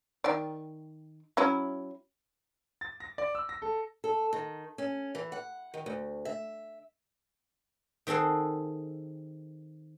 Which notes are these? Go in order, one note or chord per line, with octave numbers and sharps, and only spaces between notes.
D#3 D5
F#3 C#4 E4
A6
A#6
D5
E6
A#6
A4
A4
D#3
C#4
E3
F#5
D#3
D2
E5
D#3 C4 G#4 A4 F#5